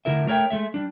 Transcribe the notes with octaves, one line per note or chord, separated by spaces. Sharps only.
A2 D3 E4 A#4 E5
A3 A#4 C#5 E5 G5
G#3 A3 E5
G3 D4